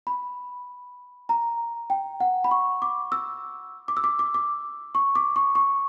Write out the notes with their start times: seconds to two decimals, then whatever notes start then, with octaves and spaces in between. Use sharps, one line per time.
0.07 B5
1.29 A#5
1.90 G5
2.20 F#5
2.44 B5
2.51 C#6
2.82 D6
3.12 E6
3.88 D6
3.97 E6
4.04 D6
4.19 D6
4.34 D6
4.95 C#6
5.15 D6
5.36 C#6
5.55 C#6